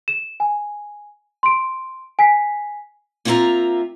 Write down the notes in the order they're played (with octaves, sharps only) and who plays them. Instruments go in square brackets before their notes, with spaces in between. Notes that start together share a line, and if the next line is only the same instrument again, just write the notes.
[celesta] E7
G#5
C6 D7
G#5 B6 C7
[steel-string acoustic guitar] A#3 C4 E4 F4 E5 A#5